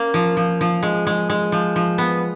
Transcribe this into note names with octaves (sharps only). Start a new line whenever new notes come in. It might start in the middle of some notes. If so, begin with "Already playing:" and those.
Already playing: A#3 C#4
F3
F3
F3
G#3
G#3
G#3
F3
F3
B3